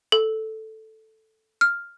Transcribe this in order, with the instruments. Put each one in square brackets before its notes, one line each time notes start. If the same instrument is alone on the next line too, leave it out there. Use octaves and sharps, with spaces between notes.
[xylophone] A4
F6